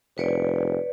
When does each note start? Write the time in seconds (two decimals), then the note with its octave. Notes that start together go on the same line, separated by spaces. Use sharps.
0.18 F1 B4 C#5 D5